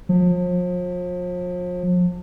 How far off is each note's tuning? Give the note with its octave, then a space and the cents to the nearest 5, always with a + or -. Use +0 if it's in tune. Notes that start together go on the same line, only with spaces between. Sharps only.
F3 +40